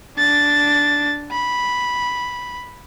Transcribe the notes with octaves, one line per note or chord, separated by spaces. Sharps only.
D4 A6
B5